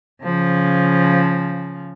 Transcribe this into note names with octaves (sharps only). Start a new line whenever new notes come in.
C#3 F3